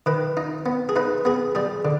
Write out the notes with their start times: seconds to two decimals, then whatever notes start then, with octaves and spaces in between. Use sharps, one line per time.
0.06 D#3 B4
0.37 D#4
0.66 B3
0.89 G#4
0.96 D#4 B4
1.25 B3 G#4
1.55 G3 G#4
1.85 D3